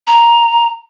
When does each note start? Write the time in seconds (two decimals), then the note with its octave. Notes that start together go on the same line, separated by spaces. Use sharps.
0.07 A#5